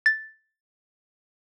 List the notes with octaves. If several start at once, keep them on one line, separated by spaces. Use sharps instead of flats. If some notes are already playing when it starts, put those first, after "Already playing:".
A6